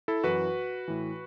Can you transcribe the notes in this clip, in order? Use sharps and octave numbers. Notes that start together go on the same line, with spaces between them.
E4 A4
F#2 E3 F#4 B4
A2 E3